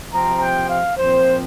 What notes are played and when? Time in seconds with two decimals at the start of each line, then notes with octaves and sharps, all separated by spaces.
0.13 C3 F3 C4 A#5
0.41 G5
0.70 F5
0.97 A#2 F3 C4 C5